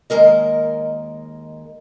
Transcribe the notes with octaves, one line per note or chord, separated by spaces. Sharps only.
D#2 F#3 G#3 A#4 D#5